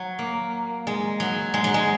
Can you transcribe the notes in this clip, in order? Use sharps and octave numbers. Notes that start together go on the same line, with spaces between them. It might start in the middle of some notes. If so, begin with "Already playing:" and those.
Already playing: F#3
A#3
G#3
F#3
G#3
F#3
G#3